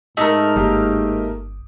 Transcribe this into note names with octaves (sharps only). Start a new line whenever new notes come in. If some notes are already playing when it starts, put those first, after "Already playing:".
G#2 A3 D#4 A#4
G1 A#3 D#4 G4